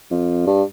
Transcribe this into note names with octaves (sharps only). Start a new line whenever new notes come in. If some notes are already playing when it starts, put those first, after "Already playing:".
F2
G2